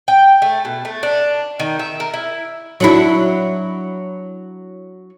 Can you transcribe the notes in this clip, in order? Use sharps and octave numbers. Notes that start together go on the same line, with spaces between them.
G5
A3
B2
A3
D4
D#3
E5
A#4
E4
F#3 D4 E4